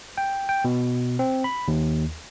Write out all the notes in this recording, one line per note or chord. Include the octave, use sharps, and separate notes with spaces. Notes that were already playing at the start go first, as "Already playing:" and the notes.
G5
G5
B2
C4
B5
D#2